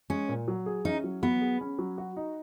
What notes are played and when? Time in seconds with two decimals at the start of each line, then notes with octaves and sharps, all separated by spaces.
0.10 G#3 C#4
0.29 A#2
0.48 F#3
0.66 G#4
0.85 C#4 D#4
1.04 F#3
1.23 F#3 B3
1.41 G#4
1.61 C#4
1.79 F#3
1.98 F#4
2.17 D#4